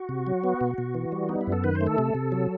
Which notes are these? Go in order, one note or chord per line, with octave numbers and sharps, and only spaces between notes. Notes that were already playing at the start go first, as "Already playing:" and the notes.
Already playing: F#4
C3
F#3
B3
B2
B2
E3
G3
B3 D#4
E4
F#2
A4
D#3 B4
C5
A3
A4
C3
C3
F#3